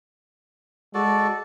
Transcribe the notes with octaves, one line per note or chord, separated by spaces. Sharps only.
G#3 F#4 A4 D5